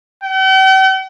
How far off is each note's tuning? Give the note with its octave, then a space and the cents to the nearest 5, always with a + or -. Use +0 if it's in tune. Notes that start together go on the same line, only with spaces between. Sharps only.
G5 -45